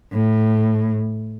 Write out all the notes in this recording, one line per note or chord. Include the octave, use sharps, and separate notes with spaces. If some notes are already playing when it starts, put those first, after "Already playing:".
A2